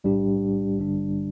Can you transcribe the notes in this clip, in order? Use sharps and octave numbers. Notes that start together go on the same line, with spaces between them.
B1 A2 G3 D4 G4
A1 G2 D3 G3 D4